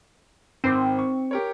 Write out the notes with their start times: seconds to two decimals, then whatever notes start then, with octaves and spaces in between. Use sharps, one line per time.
0.64 G#1 C4 C5 D6
0.99 C#6
1.31 G4 A#4 C#5